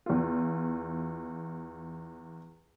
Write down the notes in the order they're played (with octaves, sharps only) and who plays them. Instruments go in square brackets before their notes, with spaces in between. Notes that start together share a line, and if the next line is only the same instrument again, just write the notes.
[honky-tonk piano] E2 F4